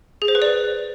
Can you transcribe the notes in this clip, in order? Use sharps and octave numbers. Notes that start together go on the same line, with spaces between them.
G#4
C5
B4
D5